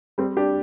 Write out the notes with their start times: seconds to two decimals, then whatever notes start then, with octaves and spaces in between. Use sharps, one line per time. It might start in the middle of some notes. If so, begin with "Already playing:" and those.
0.18 G3 C4
0.37 D4 G4